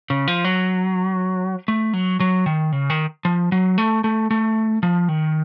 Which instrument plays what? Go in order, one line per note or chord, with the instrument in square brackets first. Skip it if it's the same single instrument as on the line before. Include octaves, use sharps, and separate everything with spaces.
[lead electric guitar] C#3
F3
F#3
A3
F#3
F#3
D#3
C#3
D#3
F3
F#3
A3
A3
A3
F3
D#3